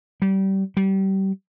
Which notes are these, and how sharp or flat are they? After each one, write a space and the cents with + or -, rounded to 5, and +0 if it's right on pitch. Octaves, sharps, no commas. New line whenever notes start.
G3 -25
G3 -25